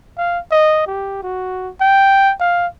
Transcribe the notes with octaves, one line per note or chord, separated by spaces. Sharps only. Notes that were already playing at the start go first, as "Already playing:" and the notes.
F5
D#5
G4
F#4
G5
F5